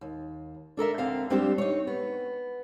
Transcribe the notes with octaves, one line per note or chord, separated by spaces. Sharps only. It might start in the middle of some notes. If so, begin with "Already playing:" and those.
D#2
D4 A4 A#4 E5
D2 D3 C4 F5
F2 G3 C4 D4 G4 C5
D#4 C#5
B3